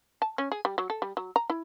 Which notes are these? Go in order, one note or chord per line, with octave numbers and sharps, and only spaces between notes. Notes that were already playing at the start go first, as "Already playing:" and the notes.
A5
C#4
G#4
G3
F#3
A4
G3
F#3
A#5
E4